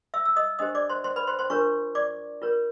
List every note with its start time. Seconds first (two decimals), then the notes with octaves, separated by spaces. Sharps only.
0.14 E5 E6
0.25 E6
0.36 D#5 D#6
0.59 D4 G4 C5 D#5 D#6
0.75 D5 D6
0.90 C5 C6
1.04 C5 C6
1.16 B4 B5
1.27 C5 C6
1.39 C5 C6
1.50 D4 F4 A#4 C#5 C#6
1.95 D5 D6
2.42 F4 A#4 C#5